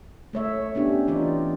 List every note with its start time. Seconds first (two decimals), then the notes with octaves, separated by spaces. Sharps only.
0.33 A3 C#5 E5
0.75 B3 C#4 D4 G4
1.07 E3 D#4 F4 D5